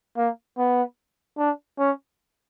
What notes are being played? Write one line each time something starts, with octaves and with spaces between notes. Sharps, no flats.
A#3
B3
D4
C#4